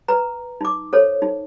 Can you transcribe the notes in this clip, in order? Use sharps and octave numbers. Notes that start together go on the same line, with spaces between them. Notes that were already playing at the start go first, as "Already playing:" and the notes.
B4 A#5
D#4 D6
A4 C5 C#5
D#4